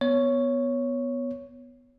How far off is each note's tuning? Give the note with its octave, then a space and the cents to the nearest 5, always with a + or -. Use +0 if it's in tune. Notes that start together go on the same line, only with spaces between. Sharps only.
B3 +0 C#5 +0